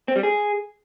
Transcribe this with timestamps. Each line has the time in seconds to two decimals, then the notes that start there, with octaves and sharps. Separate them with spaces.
0.08 C4
0.16 G3
0.23 G#4